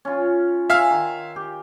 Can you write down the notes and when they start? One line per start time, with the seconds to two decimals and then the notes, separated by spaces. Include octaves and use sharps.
0.05 C#4 F4
0.70 E5 F5 G#5 C6 F6
0.90 D#3
1.36 G4